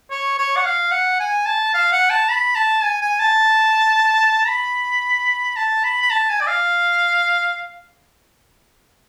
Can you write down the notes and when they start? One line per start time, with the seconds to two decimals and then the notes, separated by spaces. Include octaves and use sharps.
0.11 C#5
0.38 C#5
0.56 F#5
0.65 F5
0.91 F#5
1.20 G#5
1.46 A5
1.74 F5
1.92 F#5
2.10 A5
2.29 B5
2.55 A5
2.84 G#5
3.01 G#5
3.20 A5
4.48 B5
5.56 A5
5.84 B5
6.02 B5
6.11 A5
6.30 G#5
6.41 D5
6.47 F5